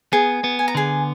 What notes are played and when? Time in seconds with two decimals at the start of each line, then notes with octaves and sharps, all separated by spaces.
0.13 B3 G#4 G#5
0.44 B3
0.59 G#5
0.68 A#5
0.75 D3 G#4 G#5